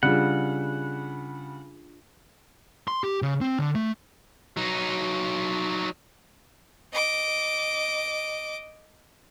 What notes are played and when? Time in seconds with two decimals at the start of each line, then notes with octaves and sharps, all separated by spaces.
0.03 C#3 G3 D4 F4 G#4 F#5
2.88 C6
3.04 G4
3.22 C#3
3.41 C4
3.59 D3
3.75 A3
4.57 F#3 D#4
6.92 D#5 D6